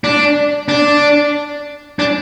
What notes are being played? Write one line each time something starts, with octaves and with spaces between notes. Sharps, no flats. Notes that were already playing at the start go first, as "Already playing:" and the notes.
D4
D4
D4